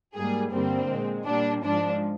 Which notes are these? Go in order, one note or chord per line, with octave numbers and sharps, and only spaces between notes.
G#2 G3 A#3 G#4
G2 D3 G3 A#3 C4
A#2 G#3
A#2 G3 A#3 D4
G#2 F3 G#3 D4